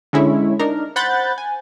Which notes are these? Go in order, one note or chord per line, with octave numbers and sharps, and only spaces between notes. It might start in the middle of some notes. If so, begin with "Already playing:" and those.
D3 G#3 C#4 E4 C#5
D4 D#4 A#4
C5 F#5 B5 F#6 G6 A6
G#5